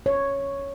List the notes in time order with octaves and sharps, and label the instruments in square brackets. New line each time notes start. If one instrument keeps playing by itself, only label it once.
[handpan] C#5